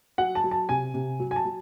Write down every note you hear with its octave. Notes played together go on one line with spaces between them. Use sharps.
F#3 F#5
A5
F#3
A5
C3 G#5
C3
F#3
G#5
A5
F#3